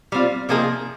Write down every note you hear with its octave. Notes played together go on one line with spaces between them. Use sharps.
G3 C4 F4
C3 F3 A#3 D#4 G#4